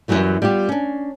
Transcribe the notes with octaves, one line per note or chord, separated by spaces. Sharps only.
F#2 A2 E3 F#3 G3
G3 B3 F4 G4
C#4 D4